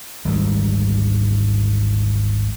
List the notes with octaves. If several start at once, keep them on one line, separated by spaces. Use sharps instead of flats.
G#1 D2 G#2 G3